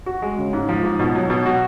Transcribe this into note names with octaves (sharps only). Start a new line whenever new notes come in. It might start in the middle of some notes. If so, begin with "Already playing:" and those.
F#4
G#3
C#3
G#2
F3
G#2
B2
F#3
B2
F#4